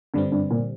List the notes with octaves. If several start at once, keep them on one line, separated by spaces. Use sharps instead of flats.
G2 D3 G3 C4
G2
A#2